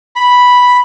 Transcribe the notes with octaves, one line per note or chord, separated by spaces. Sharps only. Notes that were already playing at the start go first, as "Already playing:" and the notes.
B5